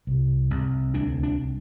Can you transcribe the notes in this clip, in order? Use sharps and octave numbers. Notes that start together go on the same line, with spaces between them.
C2
C2
D2 D4
D4